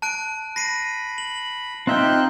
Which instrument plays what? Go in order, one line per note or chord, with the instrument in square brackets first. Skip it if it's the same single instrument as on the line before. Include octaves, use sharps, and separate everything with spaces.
[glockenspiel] A5 F#6 D7
[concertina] B5 [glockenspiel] A#6 C7 D#7
[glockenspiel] F#7
[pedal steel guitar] C4 E5 G5 [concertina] D#4 F4 F#6